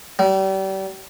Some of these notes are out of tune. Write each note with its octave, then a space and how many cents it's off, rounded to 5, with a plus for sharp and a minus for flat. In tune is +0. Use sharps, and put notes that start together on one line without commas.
G3 -35